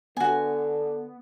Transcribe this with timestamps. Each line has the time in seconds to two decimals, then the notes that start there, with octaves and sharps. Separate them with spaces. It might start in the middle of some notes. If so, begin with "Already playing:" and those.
0.17 D3 B3 F#4 G#5